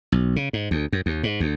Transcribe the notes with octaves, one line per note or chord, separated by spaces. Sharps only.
B1
C#3
G#2
D2
F#2
D#2
G#2
D2